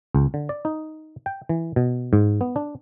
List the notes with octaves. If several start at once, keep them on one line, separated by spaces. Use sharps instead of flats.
C#2
D3
D5
D#4
G5
E3
B2
G#2
B3
D4